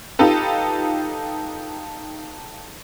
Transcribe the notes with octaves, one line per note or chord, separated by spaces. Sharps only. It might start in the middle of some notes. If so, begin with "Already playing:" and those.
D#4 F4 G4 A4 B4